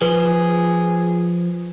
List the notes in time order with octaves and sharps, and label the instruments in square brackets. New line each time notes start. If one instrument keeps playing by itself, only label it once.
[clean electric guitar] F3 [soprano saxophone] G#4 [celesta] B4